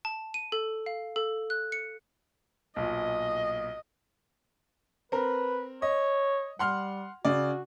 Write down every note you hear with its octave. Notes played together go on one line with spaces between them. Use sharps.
A5
D#7
A4
F5
A4
F#6
C#7
B1 A#2 D#5
C4 A#4 B4
C#5 D#5
G3 F#5 C6 F6
C#3 F#4 D5